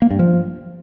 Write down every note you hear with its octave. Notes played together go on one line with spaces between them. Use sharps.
A#3
G2
F3